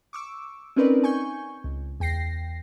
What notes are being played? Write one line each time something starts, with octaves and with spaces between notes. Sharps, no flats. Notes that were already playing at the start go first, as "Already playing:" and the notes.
C#6 D6 E6
C4 C#4 D#4 A#4 B4 D5
G#5 C#6 G6
C#2
E2 G5 A#6 C7